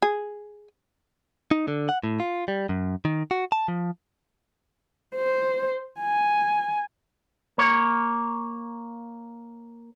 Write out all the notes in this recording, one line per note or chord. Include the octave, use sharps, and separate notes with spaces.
G#4
D#4
D3
F#5
A2
F4
G3
F#2
D#3
F#4
A5
F3
C5
G#5
A#3 C#5